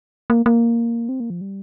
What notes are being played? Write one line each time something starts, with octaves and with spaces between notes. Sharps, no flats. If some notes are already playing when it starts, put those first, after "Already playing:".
A#3
A#3
C4
A#3
F3
G3